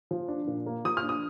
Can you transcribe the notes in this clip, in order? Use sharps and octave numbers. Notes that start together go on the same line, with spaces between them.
F3
D4
A#2
A#3
F3 D#6
F6
D4
D#6